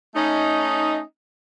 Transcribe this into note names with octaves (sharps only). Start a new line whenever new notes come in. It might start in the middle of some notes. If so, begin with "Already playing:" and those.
A3 C#4 D#4